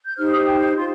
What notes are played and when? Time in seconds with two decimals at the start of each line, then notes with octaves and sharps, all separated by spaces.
0.04 G6
0.16 D#4 G4 C5 F6
0.31 D#6
0.46 G5
0.76 F4 C5 C6